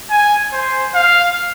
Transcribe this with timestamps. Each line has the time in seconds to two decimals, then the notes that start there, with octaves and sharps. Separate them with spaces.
0.10 G#5
0.53 C5
0.95 F5